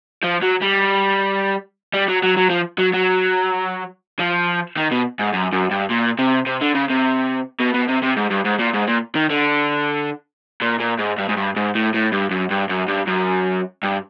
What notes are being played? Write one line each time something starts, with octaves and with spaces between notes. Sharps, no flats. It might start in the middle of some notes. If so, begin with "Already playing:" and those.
F3
F#3
G3
G3
F#3
F#3
F#3
F3
F#3
F#3
F3
D#3
B2
G#2
F#2
F#2
G2
A#2
C3
C3
D3
C#3
C3
B2
B2
C3
C3
G#2
G2
G#2
A#2
G#2
A#2
D#3
D3
A#2
A#2
G#2
G2
G#2
G2
G#2
A2
A2
G2
F#2
G2
F#2
G2
F#2
G2